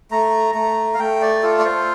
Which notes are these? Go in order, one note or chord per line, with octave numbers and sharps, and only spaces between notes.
A3 A#5
A3 A#5
F5
A3 G5
D5
F4 A4
D5
C5